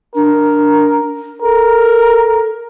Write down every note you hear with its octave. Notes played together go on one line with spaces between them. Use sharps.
D4 A#4
A4 A#4